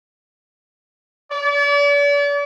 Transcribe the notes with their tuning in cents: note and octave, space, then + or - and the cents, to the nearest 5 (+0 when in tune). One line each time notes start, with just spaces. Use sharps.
D5 -40